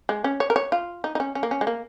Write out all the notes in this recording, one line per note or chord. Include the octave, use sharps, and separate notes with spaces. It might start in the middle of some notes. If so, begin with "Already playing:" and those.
G#3
C#4
C#5
A#4
C#5
F4
D#4
D#4
C#4
C#4
A#3
C#4
G#3
A#3